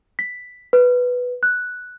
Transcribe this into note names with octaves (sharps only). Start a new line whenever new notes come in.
B6
B4
F#6